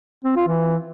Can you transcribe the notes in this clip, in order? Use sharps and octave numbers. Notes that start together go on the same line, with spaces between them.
C4
F4
E3